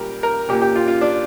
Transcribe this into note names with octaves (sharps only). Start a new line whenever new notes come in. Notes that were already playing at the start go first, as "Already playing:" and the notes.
Already playing: A#2 G3 G4 A#4
A#4
A#2 A#3 G4
G4
F4
F4
D4